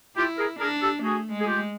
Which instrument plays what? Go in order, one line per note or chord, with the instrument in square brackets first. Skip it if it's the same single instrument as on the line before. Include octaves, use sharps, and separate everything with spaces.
[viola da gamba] E4 [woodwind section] F4 G4
[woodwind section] G#4 A#4
[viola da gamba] D4 [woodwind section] G#4 A#4
[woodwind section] G4 A4
[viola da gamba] A3 [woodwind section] F#4 G#4
[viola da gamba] G#3
[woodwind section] G#4
F4 G4